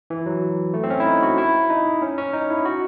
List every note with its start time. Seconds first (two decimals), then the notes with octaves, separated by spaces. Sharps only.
0.10 E3
0.26 F#3
0.74 A3
0.83 C4
0.90 C#4
1.00 E4
1.06 D#4
1.22 F#4
1.38 E4
1.70 D#4
2.02 C#4
2.18 C#4
2.33 D#4
2.50 E4
2.65 F#4